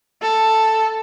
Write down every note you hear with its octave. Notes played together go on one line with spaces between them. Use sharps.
A4